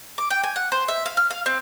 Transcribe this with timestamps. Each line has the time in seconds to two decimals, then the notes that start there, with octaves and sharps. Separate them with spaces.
0.18 D6
0.30 G5
0.44 G#5
0.56 F#5
0.72 C5
0.88 E5
1.06 F5
1.17 F6
1.31 F5
1.46 C4